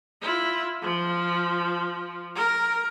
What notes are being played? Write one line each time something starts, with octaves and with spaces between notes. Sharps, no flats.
E4 F4
F3
A#4